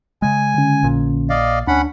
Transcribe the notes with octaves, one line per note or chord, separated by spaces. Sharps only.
C#3 G#3 G#5
D3 C#4
A#1 A#2
D5 D#5 F5
D2 C#4 D4 F#5 B5